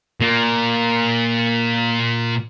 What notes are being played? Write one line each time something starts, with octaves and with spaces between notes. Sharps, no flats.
A#2 A#3